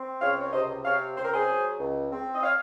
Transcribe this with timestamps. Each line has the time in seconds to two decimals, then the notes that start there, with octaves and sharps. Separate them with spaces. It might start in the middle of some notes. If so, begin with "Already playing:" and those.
Already playing: C4
0.21 C#2 C#5 F5
0.41 C#5
0.53 C3 C5 D#5
0.85 C4 C#5 F5
1.17 C#2 C5
1.25 A#4
1.34 G#4 C5
1.48 F#3
1.80 C#2
2.12 C4
2.35 D#5
2.43 C#5 F5